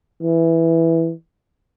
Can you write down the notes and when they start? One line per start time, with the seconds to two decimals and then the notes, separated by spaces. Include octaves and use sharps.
0.22 E3